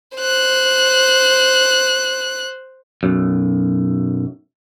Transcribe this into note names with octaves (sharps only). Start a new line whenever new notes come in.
C5 F#6
B1 F#2